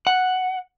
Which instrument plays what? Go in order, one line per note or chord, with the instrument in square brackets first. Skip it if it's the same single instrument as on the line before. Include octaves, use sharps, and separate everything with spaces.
[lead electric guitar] F#5